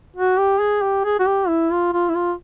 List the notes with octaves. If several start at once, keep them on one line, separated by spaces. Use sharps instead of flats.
F#4
G4
G#4
G4
G#4
F#4
G4
E4
F4
F4
E4
F4